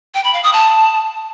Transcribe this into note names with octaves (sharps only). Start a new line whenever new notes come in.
G5
B5
F5
D#6
A5